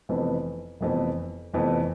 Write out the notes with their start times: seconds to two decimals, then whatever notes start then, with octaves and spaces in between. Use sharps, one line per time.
0.09 F1 F2 E3 B3
0.81 F1 F2 E3 B3
1.54 F1 F2 E3 B3